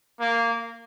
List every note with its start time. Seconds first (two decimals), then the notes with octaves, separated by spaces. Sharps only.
0.20 A#3